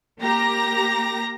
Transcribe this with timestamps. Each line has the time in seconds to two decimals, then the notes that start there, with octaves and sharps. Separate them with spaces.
0.20 A#3 G4 A#5 A#6